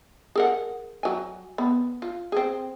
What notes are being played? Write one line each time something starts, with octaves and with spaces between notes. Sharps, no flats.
G#4 A#4 F#5
F#3 G#5
B3
F4
C4 G#4